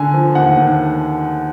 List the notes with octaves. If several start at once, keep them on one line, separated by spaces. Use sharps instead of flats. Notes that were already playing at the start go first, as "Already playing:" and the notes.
Already playing: D3 G#5
F3
D#2 F#5
D#2